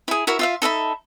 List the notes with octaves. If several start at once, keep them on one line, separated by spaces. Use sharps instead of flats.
E4 G#4
E4 F#4 A#4 E5
F4 E5 F5
D#4 A4 E5 B5